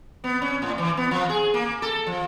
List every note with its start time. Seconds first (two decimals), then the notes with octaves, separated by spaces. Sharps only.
0.24 B3
0.42 C#4
0.62 A2
0.78 E3
0.97 B3
1.11 F3
1.29 G#4
1.54 A#3
1.82 A4
2.07 F3